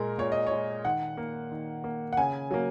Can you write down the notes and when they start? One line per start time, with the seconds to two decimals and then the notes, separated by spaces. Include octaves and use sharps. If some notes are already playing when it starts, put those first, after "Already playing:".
Already playing: A#2 G#3 A#4
0.18 A#2 C#5
0.32 D#5
0.47 C#5
0.52 G#3
0.85 D#3 F#5
1.17 A#3
1.52 D#3
1.84 A#3
2.13 F#5
2.17 C#3 G#5
2.51 F#3 A#3